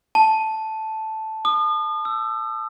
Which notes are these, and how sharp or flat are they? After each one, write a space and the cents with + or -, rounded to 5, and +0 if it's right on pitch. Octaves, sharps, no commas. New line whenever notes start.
A5 -5
D#6 -40
E6 +20